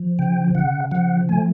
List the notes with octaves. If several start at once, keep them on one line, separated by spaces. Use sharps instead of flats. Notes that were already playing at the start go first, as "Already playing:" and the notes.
Already playing: F3
C#3 G5
C#3 F#5
F3 F#5
A3 G#5